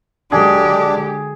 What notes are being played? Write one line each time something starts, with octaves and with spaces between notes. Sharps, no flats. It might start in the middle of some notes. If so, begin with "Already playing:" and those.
D3 F#3 G#3 D4 G4 G#4